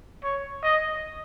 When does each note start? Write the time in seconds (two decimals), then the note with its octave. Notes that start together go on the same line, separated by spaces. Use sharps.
0.23 C#5
0.63 D#5